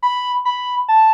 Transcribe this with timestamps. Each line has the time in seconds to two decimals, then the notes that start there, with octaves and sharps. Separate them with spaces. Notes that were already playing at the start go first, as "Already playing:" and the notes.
0.03 B5
0.45 B5
0.88 A5